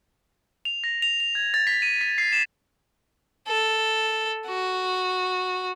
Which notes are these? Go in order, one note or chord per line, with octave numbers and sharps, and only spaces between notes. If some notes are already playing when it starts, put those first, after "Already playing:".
F7
A#6
F7
F7
G#6
A6
B6
D#7
B6
C7
E7
A4
F#4